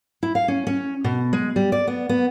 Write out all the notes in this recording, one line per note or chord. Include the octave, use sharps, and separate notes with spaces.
E4
F5
C#4
C#4
B2
G#3
G3
D5
B3
B3